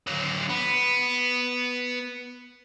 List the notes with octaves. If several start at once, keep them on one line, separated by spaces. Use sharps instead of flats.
D3 F#3
B3